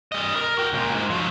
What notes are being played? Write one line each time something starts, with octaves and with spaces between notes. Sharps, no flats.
G3 D#5
A#4
F#4 G5
C#2 A#2
G#2
F3 F#3